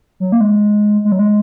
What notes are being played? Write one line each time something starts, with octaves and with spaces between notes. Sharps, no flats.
F#3
A#3
G#3
G#3
F#3
G#3